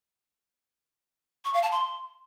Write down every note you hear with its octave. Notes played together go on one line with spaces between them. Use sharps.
C#6
F5
A5
C6